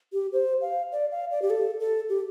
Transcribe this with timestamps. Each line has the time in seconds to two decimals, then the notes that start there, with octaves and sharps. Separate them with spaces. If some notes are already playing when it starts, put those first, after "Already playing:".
0.13 G4
0.33 C5
0.61 F5
0.92 D5
1.11 F5
1.31 D5
1.42 G4
1.50 A4
1.80 A4
2.09 G4